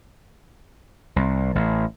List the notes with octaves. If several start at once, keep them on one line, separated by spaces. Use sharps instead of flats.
C2
A1